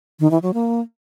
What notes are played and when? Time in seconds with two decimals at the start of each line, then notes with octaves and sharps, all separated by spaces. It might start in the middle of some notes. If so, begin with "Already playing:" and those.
0.20 D#3
0.31 E3
0.42 F#3
0.54 A#3